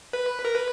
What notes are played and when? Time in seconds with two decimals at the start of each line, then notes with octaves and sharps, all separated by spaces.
0.13 B4
0.45 A#4
0.55 B4